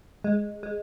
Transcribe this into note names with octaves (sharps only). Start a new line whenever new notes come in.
G#3
G#3